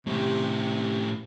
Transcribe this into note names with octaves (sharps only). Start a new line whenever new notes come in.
A2 C3 G4